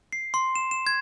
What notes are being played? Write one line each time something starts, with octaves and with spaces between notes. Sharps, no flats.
C7
C6
E7
E7
G#6